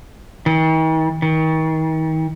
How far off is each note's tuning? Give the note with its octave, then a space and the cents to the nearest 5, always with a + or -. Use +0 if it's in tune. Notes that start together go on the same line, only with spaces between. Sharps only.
D#3 +45
D#3 +35